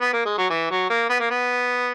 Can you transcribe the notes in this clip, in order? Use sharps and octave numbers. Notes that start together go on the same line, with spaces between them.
B3
A#3
G#3
F#3
E3
F#3
A#3
B3
A#3
B3